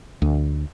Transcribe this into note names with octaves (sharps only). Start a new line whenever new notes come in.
D2